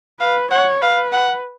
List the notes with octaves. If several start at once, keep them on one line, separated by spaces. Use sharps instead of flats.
B4 F5
C#5 F#5
B4 F5
F#5